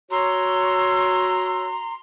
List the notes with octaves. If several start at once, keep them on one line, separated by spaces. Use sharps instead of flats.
F#4 C#5 A#5 C6 E6